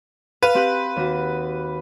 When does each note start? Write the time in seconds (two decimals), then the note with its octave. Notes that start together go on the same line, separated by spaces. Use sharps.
0.43 B4 F5
0.55 C4 G4 F#6
0.96 D#2 F#4